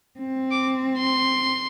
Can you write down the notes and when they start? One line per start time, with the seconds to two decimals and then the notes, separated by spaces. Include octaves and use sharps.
0.20 C4
0.51 D6
0.98 C6